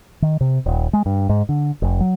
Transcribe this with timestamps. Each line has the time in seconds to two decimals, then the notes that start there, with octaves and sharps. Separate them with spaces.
0.22 D#3
0.41 C3
0.66 D#1
0.93 G#3
1.06 G2
1.29 G#2
1.49 D3
1.82 F1
2.00 F#3